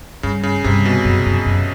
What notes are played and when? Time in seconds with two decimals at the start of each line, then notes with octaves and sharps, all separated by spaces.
0.23 G2 C#3
0.43 C#3
0.64 G2 C3
0.85 B2
1.05 F#2
1.26 F#2
1.46 F#2